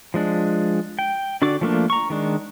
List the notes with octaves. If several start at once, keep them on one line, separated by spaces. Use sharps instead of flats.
F3 G#3 D4
G5
D3 D4 F#4 D5 D6
F3 A3 A#3 D4
A#5 C#6
D#3 G#3 D4